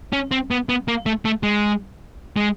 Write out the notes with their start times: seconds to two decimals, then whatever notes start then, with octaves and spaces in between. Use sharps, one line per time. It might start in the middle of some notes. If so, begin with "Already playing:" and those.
0.13 C#4
0.31 C4
0.51 B3
0.69 B3
0.88 A#3
1.06 A3
1.25 A3
1.43 G#3
2.36 G#3